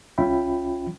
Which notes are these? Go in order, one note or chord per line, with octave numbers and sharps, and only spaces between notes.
C2 C#4 F4 E5 G5 B5